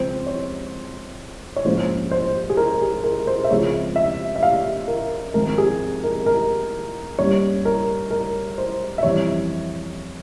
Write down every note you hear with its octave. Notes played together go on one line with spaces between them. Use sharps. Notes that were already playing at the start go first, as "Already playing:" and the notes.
Already playing: C#2 C#3 F3 C4 C5
C#5
C#5
A#1 G#2 F3 A#3 C#4 C5
C5
G#4
A#4
G#4
A#4
C5
E5
C#2 C#3 F3 G#3 C4 C#5
E5
E5
F5
A#4
G#1 G#2 F3 C4 A#4
G#4
A#4
A#4
G2 G3 A#3 C#4 C#5
A#4
A#4
C5
E5
F2 E3 G3 C4 C#5